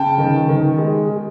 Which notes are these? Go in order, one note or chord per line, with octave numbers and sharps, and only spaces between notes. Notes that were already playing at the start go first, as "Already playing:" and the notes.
Already playing: C#3 G5 A5
D#3
D#3
G#3
G#3